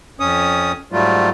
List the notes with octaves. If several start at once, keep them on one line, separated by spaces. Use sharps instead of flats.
F2 C#4 D#6
G#2 F#3 G3 A3 F4